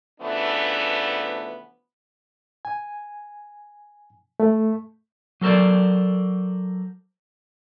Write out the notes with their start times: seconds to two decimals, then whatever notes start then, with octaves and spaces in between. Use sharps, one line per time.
0.20 C#3 E3 F3 A3 B3 D4
2.65 G#5
4.40 A3
5.41 F#3 A4 A#4 C5 D5